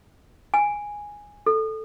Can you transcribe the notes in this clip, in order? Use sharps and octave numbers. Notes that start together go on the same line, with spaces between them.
G#5
A4